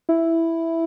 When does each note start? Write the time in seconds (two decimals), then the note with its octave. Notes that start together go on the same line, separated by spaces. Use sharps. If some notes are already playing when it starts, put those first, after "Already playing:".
0.09 E4